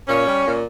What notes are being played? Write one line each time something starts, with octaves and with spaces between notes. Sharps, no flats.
A#2 C#4
G3
A#2